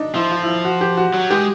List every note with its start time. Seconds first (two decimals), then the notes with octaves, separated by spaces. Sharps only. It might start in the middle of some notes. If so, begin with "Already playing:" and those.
Already playing: D4 D#4
0.15 F3 E4
0.31 F4
0.43 E4
0.48 F4
0.65 F#4
0.81 G4
0.97 F#4
1.14 F#3
1.30 G#3 G4